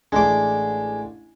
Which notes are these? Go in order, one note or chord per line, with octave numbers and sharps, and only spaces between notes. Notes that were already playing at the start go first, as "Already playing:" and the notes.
A1 G#3 A3 D4 D6